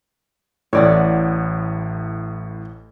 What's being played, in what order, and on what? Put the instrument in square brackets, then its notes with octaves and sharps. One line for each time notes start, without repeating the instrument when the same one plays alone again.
[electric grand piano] A1 A2 [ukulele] C#5 D5 F#5